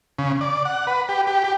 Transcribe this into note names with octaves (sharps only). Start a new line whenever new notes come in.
C#3
D5
F#5
B4
G4
G4
G4